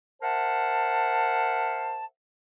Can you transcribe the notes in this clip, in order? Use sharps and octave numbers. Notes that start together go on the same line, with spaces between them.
A#4 C5 E5 F#5 A5